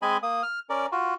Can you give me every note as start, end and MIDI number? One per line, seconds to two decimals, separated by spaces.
0.02 0.17 56
0.02 0.17 60
0.02 0.17 75
0.02 0.17 80
0.02 0.17 83
0.23 0.43 58
0.23 0.43 87
0.43 0.59 89
0.70 0.86 61
0.70 0.86 70
0.70 0.86 74
0.92 1.14 65
0.92 1.14 66